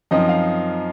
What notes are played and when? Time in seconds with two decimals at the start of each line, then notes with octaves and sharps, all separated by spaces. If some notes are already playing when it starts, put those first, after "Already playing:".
0.11 F#2 F3 C4 D#4 D#5
0.29 F5